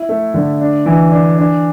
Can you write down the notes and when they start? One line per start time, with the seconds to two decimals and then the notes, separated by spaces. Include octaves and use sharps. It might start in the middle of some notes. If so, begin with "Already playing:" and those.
Already playing: E4
0.09 A3
0.34 D3
0.61 D4
0.86 E3
1.12 D4
1.38 D4